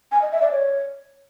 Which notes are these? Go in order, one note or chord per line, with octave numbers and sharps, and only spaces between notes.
G#5
D#5
E5
D5
C#5